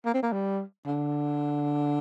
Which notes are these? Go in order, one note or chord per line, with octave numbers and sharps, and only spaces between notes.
A#3
C4
A#3
G3
D3